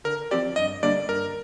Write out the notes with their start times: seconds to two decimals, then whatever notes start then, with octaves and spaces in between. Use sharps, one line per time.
0.04 D3 A#4
0.31 F3 C4 G4 D5
0.56 G2 D#5
0.82 D3 G3 A#3 D4 D5
1.09 G2 A#4